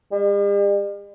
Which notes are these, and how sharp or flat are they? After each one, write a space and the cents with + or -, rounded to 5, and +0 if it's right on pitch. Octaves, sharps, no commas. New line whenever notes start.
G3 +45